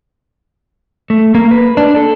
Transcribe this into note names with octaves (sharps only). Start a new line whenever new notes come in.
A3
A#3
B4
D4
A4